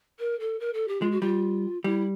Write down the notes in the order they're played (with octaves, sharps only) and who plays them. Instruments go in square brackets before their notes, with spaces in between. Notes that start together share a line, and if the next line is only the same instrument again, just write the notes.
[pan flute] A#4
A4
A#4
A4
G4
[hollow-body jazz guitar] G#3 [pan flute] F4
[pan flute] F#4
[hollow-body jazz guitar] G3 [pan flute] F4
[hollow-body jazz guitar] G3 [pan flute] E4